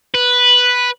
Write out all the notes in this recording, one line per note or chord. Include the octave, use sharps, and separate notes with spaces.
B4